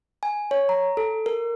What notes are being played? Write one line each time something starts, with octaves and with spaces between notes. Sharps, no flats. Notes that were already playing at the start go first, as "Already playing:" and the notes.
G#5
C#5
A#5
A4
A#4